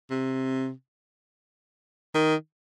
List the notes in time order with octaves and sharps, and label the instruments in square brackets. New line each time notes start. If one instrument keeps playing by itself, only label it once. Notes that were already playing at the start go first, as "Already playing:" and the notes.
[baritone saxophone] C3
D#3